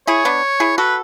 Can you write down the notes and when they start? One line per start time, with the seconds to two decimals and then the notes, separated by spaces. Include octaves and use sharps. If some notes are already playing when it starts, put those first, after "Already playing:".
0.07 E4 G#4 C#5
0.25 B3 D4
0.60 E4 G#4
0.78 F#4 A4 B4